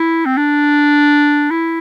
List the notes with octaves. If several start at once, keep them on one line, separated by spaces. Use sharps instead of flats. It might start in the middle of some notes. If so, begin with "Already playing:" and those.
Already playing: E4
C4
D4
E4